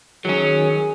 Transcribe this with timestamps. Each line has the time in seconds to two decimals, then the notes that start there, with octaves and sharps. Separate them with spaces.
0.25 D#3 F#3 C#4 G#4